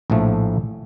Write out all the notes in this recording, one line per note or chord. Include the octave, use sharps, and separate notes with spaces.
A#1 A2 F3 A3